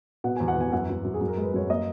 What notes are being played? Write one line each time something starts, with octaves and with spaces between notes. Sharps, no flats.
B2 F#5
E2 G#5
F#5
E2 G#5
F#2 F#5
F#2
F#2
G#4
F#2
A#4
G#3 B4
F#2 C#5
A#3 D#5